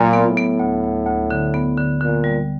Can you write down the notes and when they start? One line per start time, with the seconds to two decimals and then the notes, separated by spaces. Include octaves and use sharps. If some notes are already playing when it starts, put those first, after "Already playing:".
Already playing: A#2 F#3
0.13 B3
0.25 A2
0.37 B3
0.59 D2
0.83 D2
1.07 D2
1.31 D3
1.54 B3
1.77 D3
2.01 A#2 D3
2.24 G3